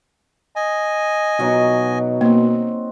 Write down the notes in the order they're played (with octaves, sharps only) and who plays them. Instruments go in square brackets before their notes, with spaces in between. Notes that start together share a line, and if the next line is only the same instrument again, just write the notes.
[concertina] D#5 G#5
[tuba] B2 [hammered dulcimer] F#3 D#4 F#4
[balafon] A#3 [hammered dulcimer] C4